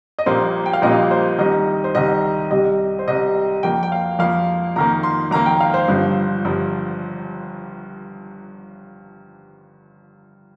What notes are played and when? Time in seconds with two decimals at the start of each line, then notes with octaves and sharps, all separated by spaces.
0.19 D#5
0.26 A#1 A#2 G3 A#3 C5
0.66 G5
0.73 F5
0.82 A#1 A#2 G3 A#3 D#5
1.11 C5
1.38 C2 C3 D#3 D#5
1.84 C5
1.95 C2 C3 D#3 D#5
2.51 C2 C3 G3 D#5
2.99 C5
3.08 C2 C3 G3 D#5
3.63 F2 F3 A#3 G5
3.83 G5
3.92 F5
4.19 F2 F3 A#3 F5
4.76 F2 D#3 A#3 A#5
5.03 C6
5.31 F2 D#3 A#3 A#5
5.46 G5
5.61 F5
5.74 C5
5.88 G1 G2 F3
6.45 G1 G2 F3